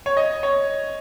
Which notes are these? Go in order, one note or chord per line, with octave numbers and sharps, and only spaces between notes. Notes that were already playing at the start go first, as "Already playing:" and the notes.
C#5
D#5
C#5